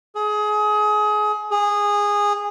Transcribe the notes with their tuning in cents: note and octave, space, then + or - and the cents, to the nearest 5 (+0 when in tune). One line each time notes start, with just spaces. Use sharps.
G#4 +25
G#4 -15